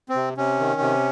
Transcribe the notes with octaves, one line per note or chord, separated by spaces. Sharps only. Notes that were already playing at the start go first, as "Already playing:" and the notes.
C4
C3
C3 C#4
D#3
C3